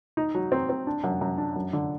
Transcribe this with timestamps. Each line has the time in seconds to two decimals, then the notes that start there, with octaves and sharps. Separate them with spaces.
0.17 D#4
0.35 F#3
0.52 C4
0.70 C4
0.87 D4
1.04 F#2
1.21 F#2
1.38 D4
1.56 F#2
1.73 D3